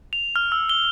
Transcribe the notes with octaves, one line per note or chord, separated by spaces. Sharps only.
F7
F6
E6
G7